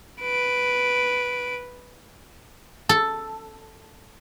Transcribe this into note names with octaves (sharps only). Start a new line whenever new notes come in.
B4 D7
A4